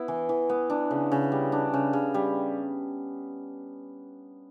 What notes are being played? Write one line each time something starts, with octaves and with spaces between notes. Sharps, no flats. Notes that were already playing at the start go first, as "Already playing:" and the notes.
Already playing: B3 E4
E3
E3
B3
D4
C#3
C#3
G3
D4
C#3
C#3
G3